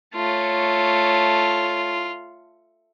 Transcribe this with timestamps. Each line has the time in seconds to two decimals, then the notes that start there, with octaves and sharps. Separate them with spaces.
0.15 A3 F4 C#5